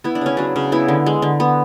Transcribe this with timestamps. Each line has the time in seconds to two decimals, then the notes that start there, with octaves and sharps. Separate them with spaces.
0.04 B3 E4
0.15 D4
0.21 C#3 C#4
0.37 F#3 D4
0.56 C#3
0.72 B3 E4
0.88 D3
1.06 G#3
1.22 D3
1.40 B3